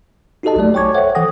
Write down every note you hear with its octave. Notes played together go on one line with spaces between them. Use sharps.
D#4 F#4 G4 A4 D#5 A5
A#1 F#3 A3 D5
C#5 G5 G#5 C#6 D6 G#6
A4 C5 C#5 E5 F#5
E3 A4 F#5 G5 D#6 A#6